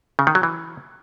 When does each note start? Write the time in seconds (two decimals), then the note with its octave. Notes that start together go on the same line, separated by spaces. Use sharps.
0.19 C#3
0.27 D#3
0.35 F#3
0.43 E3